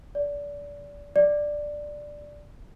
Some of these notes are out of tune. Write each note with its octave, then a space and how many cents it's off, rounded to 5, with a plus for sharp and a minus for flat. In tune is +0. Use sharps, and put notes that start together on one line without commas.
D5 -25
D5 +5